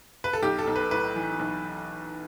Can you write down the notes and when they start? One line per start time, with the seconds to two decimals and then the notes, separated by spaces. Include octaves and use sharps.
0.24 B4
0.33 A4
0.42 B1 G4
0.59 A4
0.67 B1
0.76 B4
0.91 A2 B4
1.16 E3
1.39 B1